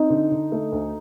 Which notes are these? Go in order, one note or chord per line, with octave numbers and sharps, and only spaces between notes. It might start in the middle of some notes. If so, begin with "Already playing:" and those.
Already playing: C4 D#4
D3
D3
A3
D2